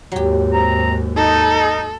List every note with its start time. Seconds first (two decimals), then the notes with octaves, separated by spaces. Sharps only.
0.12 D#2 G#2 F#3 G4
0.52 C4 A#5
1.16 D#4 A4